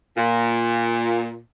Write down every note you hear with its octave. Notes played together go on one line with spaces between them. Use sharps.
A#2